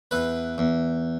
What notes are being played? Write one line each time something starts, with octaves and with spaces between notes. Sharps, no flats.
E2 B4
E2